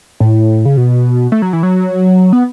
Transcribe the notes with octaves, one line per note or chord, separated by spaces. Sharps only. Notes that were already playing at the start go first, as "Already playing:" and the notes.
A2
C#3
B2
A3
F#3
E3
F#3
B3